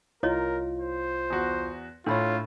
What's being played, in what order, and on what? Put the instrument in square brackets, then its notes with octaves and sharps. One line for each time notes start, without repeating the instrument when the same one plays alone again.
[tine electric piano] C2 F4 [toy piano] E4 C#5 D#5 [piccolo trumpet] A#4
[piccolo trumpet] C5
[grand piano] E2 F#4
[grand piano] A2 [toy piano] D4 B5 C6 [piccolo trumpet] F4 [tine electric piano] A4 C#5